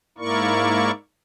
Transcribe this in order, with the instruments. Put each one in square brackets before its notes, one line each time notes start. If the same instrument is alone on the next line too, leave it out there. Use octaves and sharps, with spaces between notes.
[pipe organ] G#2 A#3 E4 A#4 D5 C#6